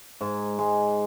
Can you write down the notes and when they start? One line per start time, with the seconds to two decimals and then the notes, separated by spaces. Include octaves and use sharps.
0.21 G#2
0.59 G#3